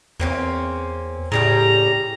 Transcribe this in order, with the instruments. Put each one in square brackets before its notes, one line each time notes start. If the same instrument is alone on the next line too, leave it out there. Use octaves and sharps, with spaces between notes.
[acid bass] E2 [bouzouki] A#3 C4 C#4
[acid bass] A2 [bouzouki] C#3 G3 G4 [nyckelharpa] A#5